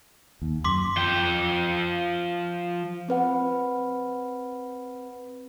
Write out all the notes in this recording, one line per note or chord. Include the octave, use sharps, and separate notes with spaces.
D#2
F#2 C6 D6 B6
F3 G5
C4 B4 F#5